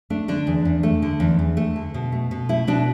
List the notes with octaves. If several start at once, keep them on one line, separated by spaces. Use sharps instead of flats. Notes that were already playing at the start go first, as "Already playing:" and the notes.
A3 D4
D3 D4
E2
E2
A3
D3
E2
E2
A3
D3
B2
A3
B2
A3 E4
B2 D4